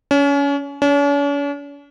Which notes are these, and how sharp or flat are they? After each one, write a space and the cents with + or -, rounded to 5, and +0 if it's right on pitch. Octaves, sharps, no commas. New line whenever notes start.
C#4 +30
C#4 +45